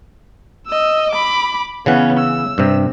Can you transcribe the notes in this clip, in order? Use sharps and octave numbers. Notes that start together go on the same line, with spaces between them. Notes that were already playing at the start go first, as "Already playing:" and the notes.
D#5 E6
B5 D6
C#3 E3 B3 C#4 F#5
E6
G2 C3